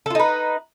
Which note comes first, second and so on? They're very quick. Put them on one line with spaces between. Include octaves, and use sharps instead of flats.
A4 F4 D#4 B4